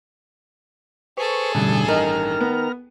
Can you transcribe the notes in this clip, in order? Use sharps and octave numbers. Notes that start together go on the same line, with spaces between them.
G#4 A4 B4 C5 C#6
A1 G2 B2 D3 G3
D#3 A#5 F6
B3